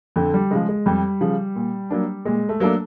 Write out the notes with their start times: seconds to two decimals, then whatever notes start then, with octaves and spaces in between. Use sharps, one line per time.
0.16 F2 D3
0.34 G3
0.51 C#3 F3 G#3
0.69 G#3
0.86 F2 G3
1.21 C#3 F3
1.56 A#2
1.90 F#3 A#3 D4
2.25 A#2 G#3
2.49 A3
2.60 F#3 A3 A#3 D4